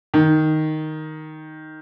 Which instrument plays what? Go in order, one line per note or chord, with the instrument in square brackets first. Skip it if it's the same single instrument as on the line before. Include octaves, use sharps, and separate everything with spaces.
[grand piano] D#3